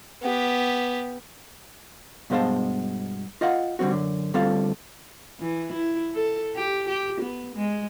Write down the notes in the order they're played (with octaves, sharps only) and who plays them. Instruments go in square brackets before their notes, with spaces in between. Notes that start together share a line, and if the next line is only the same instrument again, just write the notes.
[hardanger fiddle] B3 G4
[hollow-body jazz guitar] G2 B2 G#3 C5 F5 A5
F4 D#5 F5 F#5
D3 G3 G#3 C4 F#4
F#2 D3
D2 G3 C4 F4 A4 F5
[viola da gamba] E3
E4
A4
G4
G4
B3
G#3